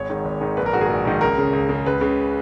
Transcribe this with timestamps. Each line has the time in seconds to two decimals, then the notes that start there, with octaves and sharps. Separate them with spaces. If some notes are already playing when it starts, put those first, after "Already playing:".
Already playing: G#1 C#5
0.10 G#2 D#3
0.25 G#1
0.41 G#2 D#3
0.57 A#1 B4
0.66 A#4
0.73 G#2 D#3 F#4
0.81 G#4
0.90 A#1
1.05 G#2 D#3
1.21 C#2 A#4
1.38 C#3
1.53 C#2
1.69 C#3
1.86 C#2 B4
2.01 C#3